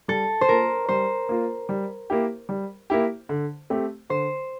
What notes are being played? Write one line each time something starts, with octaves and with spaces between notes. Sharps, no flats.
G3 A4
C5
A#3 F4 A#4
G3 C5
A#3 F4
G3
A#3 E4 G4
G3
A#3 E4 G4
D3
A3 C4 G4
D3 C5